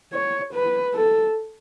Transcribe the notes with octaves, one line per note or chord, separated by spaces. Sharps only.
C#5
B4
A4